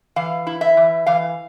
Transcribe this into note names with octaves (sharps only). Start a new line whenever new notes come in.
E3 F5
E4
E5
E3
E3 F5